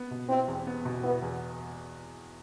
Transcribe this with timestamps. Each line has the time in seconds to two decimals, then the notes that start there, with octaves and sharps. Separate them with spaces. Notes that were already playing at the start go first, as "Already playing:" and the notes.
Already playing: B3
0.11 B2
0.29 C4 E4
0.48 E2
0.67 B3
0.85 B2
1.04 B3 E4
1.22 E2